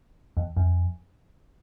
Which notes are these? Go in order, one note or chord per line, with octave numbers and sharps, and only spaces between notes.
E2
F2